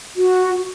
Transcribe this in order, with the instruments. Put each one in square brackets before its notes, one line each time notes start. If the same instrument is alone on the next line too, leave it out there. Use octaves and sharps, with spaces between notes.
[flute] F#4